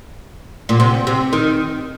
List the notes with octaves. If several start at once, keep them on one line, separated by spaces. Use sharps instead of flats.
A#2
C3
C3
D#3